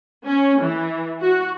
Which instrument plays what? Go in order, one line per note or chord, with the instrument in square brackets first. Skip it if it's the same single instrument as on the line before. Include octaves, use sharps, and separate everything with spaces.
[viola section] C#4
E3
F#4